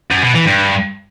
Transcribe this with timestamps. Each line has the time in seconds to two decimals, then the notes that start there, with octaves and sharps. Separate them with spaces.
0.11 F#2
0.23 B2
0.34 E3
0.46 G2